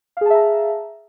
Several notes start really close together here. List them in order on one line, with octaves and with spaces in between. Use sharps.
F5 G#4 A5 E5 A#5